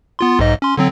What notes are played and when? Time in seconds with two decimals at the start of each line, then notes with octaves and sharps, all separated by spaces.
0.19 B3 F4 C6
0.39 B1 G#2 D#5
0.62 C#4 C6
0.77 D3 F#3 C4